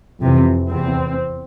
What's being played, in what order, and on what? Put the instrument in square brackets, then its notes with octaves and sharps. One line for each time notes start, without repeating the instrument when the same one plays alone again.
[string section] F2 C3 E3
E2 C3 E3 C4